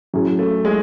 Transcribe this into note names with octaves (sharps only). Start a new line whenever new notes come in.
A2 F#3 C#4 G#4
A3
G#3